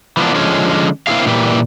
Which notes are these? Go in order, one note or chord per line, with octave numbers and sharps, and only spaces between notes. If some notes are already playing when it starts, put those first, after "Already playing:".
E3 F3 A#3 B3 D4
D3 F3 G#3 C#4
A#3 C4 E4 G#4 F5
A#2 E3 G4